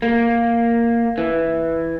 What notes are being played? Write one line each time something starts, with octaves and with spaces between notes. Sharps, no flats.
A#3
E3